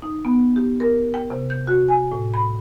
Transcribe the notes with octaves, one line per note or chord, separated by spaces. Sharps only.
D#4
B3
G4
A#4
G5
C3
G6
F#4
G#5
A2
B5